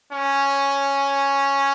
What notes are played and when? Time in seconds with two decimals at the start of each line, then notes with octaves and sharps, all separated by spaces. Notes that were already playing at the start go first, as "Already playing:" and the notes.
0.12 C#4